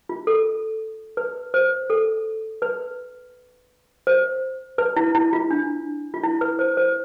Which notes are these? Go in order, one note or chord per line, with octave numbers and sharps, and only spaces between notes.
F4
A4
B4
C5
A4
B4
C5
B4
E4
E4
F4
D4
F4
E4
B4
C5
C5